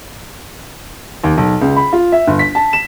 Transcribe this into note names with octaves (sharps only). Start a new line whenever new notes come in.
D#2
B1
C#2
B5
F4
E5
G1
B6
A5
E7